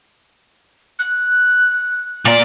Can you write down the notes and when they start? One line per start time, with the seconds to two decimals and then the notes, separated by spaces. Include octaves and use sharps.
0.99 F#6
2.25 A#2 D5